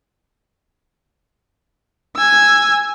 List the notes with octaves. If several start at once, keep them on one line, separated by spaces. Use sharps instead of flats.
G#5 E6